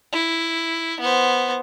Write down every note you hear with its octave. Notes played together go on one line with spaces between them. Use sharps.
E4
B3 C5